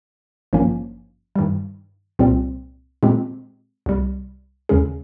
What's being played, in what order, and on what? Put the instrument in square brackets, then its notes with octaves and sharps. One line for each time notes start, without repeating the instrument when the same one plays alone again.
[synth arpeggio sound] G#1 G2 F3 A#3 C#4
G2 D#3 G3
C2 A#2 G3 C4
A#2 G#3 C4 G4
C2 C3 G3
D#2 C#3 G#3 C#4 G#4